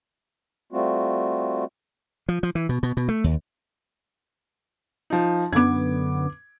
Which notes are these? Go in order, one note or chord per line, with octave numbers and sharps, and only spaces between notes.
G3 A3 C4 F4 F#4
F3
F3
E3
B2
B2
B2
A3
D#2
F3 D#4
F#2 D3 B3 D6 G#6